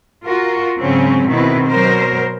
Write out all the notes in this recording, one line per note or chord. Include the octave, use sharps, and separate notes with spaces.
F4 F#4 A#4
G#2 C#3 F#3 C4 C#4
B2 D#3 C4 E4 B4
B2 F#3 A#4 C5